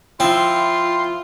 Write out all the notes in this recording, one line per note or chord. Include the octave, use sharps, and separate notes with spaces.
F3 C4 E4 F4 C6